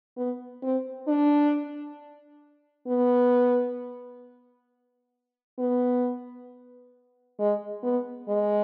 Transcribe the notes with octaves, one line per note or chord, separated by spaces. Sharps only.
B3
C4
D4
B3
B3
G#3
B3
G#3